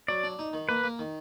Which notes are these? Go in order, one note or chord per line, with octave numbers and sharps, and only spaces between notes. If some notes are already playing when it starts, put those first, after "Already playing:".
F#3 D5
D4
D#4
D#3
A#3 B4
A#3
D#3